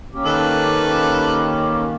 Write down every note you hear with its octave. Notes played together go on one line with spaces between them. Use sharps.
A#3 C#4 G4
D#3 A4 B4